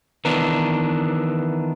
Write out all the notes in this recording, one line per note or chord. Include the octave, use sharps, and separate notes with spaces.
D#3 E3 B3 D4